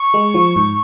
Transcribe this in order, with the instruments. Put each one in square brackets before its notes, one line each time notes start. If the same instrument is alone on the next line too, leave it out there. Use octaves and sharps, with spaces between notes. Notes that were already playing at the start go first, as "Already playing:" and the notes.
Already playing: [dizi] C#6
[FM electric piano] G#3
F3
G#2